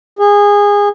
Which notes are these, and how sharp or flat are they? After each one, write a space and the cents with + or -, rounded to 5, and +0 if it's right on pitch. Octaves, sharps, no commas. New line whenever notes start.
G#4 -25